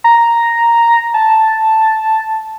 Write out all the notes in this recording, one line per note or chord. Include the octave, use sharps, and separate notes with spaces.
A#5
A5